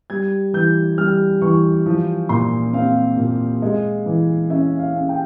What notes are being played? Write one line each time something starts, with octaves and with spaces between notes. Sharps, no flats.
G3 G#6
E3 G6
G3 F6
E3 C#6
F3
A#2 C6
C4 F5
A#2
G#3
E3
C#4 E5
F5
C#4
G5